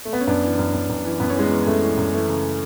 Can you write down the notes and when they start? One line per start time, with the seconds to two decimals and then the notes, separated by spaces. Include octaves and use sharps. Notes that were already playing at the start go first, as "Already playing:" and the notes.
0.05 A3
0.13 B3
0.21 C#4
0.27 F#2 B3 D4
0.44 E3
0.59 F#2
0.74 F#2
0.89 F#2
1.05 E3
1.20 F#2 B3
1.30 C#4
1.36 E3 G#3 B3
1.51 E3
1.67 F#2 A3
1.82 E3
1.97 F#2
2.12 E3 A3
2.28 C#3